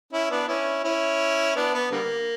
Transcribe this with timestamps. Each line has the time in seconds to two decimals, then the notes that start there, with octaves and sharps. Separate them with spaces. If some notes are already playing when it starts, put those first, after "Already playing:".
0.13 C#4 E4
0.31 B3 D4
0.48 C#4 E4
0.84 C#4 E4
1.56 B3 D4
1.74 B3
1.92 D3 G3 A#3